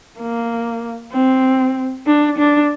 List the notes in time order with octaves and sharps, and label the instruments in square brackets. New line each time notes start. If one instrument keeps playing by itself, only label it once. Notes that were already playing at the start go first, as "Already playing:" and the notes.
[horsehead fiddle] A#3
C4
D4
D4